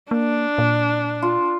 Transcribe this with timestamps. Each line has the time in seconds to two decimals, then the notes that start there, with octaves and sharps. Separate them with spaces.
0.11 A#3 D4
0.58 A#2
1.22 F4